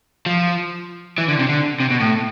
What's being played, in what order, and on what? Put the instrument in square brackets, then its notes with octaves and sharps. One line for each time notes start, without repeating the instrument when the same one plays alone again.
[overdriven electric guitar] F3
E3
D3
C3
D3
C3
B2
A2